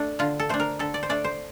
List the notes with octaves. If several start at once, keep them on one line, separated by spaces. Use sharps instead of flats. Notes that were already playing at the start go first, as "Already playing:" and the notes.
Already playing: A3 D4
D3 F4
A4
A3 D4 C5
A#4
D3 A4
D5
C5
A3 D4 D5
C5